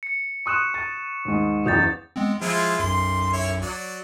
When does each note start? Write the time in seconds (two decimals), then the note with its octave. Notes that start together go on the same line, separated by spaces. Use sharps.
0.03 C#7
0.46 C6 C#6 D#6 F#6 E7
0.74 A6
1.25 D#2 G#2
1.66 F#1 E2 D#6 G6 A6
2.16 G#3 B3 C4
2.42 F3 G#3 E4 F4
2.79 B1 F#2 C6
3.33 E4 C#5
3.62 F#3 D5